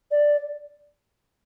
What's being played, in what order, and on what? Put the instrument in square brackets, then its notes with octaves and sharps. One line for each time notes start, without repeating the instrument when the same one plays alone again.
[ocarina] D5